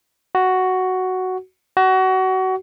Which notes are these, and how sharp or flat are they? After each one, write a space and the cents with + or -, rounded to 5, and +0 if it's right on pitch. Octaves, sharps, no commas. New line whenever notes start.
F#4 +5
F#4 +25